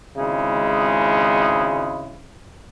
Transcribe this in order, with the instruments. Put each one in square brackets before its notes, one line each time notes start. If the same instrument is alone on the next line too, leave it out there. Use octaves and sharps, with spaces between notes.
[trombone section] G#1 C#3 G#3 E4